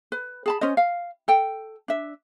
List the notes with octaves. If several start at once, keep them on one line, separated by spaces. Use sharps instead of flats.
B4
G#4 A5 B5
C#4 C5 D#5
F5
A4 G5
D4 E5